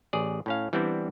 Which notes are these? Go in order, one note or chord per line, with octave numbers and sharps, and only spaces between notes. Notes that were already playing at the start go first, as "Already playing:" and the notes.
A1 G#4 D5
A2 C#4 F5
E3 G3 B3 C4 D4 E4